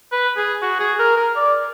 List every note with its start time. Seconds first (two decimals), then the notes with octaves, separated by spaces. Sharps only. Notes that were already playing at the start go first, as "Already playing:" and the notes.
0.12 B4
0.37 G#4
0.62 F#4
0.80 G#4
0.99 A#4
1.17 A#4
1.36 D5